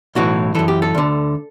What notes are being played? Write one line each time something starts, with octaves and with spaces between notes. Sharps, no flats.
B1 A2 E3 F#4
F#2 E3 A4
G4
A4
D2 D3